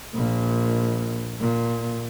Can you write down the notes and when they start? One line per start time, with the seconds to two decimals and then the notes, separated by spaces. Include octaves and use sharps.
0.15 A#1 A#2
1.40 A#2